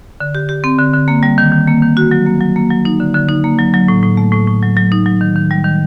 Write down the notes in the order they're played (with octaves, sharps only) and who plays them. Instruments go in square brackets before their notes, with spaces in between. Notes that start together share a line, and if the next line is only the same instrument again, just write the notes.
[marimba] D3
G4
G4
C4
D3
D3
A#3
G3
D#3
D#3
A#3
D#3
F#4
F#3
A#3
F#3
A#3
F#3
D#4
D3
D3
D#4
A#3
F#3
F#3
A2
A2
A3
A2
A2
F#3
F#3
D#4
F#3
D#3
D#3
G3
D#3